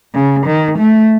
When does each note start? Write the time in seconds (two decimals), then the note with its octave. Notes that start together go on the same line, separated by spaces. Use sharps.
0.14 C#3
0.46 D#3
0.78 A3